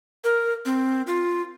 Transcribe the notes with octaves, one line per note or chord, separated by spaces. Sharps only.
A#4
C4
F4